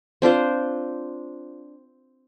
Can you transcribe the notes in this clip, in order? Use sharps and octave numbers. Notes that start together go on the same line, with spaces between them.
C4 D4 F4 C5